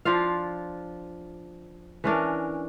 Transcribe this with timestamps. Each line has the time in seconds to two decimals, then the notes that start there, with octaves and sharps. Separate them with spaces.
0.05 F3 D4 F4 F5
2.04 E3 C#4 D4 A#4